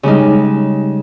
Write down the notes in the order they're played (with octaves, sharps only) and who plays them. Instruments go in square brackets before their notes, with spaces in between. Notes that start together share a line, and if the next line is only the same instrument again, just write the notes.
[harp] C#3 G3 G#3 D#4